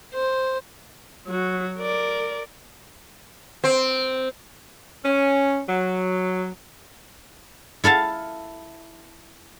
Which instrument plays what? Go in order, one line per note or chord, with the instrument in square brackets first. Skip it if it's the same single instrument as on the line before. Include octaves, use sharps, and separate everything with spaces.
[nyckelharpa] C5
[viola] F#3 F#4
A#4 D5
[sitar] C4
[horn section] C#4
F#3
[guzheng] E4 A4 F5 A5